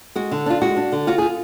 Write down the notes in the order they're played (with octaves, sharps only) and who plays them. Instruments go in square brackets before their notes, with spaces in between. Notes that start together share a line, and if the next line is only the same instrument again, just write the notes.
[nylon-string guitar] G#3 F#4
D3
D4 F4
G#3 F#4
D4
D3
F4 F#4
G#4
F4